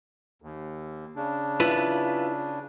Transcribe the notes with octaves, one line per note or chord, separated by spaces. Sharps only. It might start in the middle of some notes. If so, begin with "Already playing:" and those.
D#2
C#3 D4
E4 F4 B4